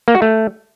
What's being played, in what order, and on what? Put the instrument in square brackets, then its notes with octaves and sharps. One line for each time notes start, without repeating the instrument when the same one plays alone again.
[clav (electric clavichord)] A#3
F#4
A3